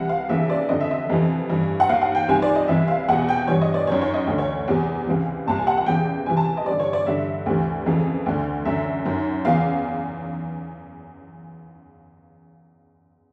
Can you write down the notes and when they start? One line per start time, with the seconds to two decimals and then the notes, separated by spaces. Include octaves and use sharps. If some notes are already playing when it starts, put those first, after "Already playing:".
Already playing: C2 C3 E3 F#5
0.09 F5
0.29 D#2 C#3 E3 E5
0.50 D5
0.69 F2 D3 D#5
0.81 E5
0.91 D#5
1.10 F2 C3 E3
1.50 G2 E3
1.80 F#5
1.89 D#2 D#3 F5
2.02 F#5
2.15 G5
2.28 C2 C3 D#3 G#5
2.42 D5
2.56 D#5
2.68 C2 C3 E3 E5
2.88 F5
3.09 E2 B2 F#5
3.29 G5
3.47 G2 E3 C#5
3.62 D#5
3.74 D5
3.87 F#2 D#3 C#5
4.02 C#5
4.14 D#5
4.27 D2 D3
4.38 C#5
4.67 E2 C3 E3
5.07 C#2 C3 E3
5.47 C2 A#2 A5
5.58 G#5
5.67 F#5
5.78 F#5
5.86 E2 C#3 E3 G5
6.26 C2 C3 E3 G#5
6.37 A5
6.57 D#5
6.66 G2 D3 D5
6.80 C#5
6.93 D5
7.06 G2 D3 E5
7.46 D2 C3 E3
7.86 F2 C#3 E3
8.26 D2 D3
8.65 F#2 D3 E5
9.05 F#2 D#3
9.45 E2 C#3 E3 F5